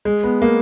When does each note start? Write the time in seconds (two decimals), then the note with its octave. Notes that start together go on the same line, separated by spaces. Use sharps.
0.05 G#3
0.24 B3
0.42 A#3